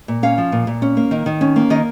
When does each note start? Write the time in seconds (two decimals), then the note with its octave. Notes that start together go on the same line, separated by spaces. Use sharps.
0.08 A#2
0.23 C#4 F5
0.38 F3
0.52 A#2
0.67 A#2
0.82 C#4
0.97 A#3
1.11 D#3
1.26 D#3
1.41 C#4
1.56 A#3
1.70 D#3 D#5